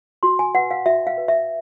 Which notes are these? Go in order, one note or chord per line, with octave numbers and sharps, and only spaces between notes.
F#4 C6
G#5
B4 F#5
F5
F#4 E5
F5
B4
E5